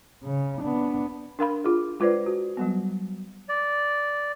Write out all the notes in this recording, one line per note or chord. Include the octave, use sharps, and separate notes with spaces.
C#3
B3 D4
D4 A#4 F5 B5
F4 G#4
G#3 F4 B4 C5 D5
F#4
F#3 G3 B3
D5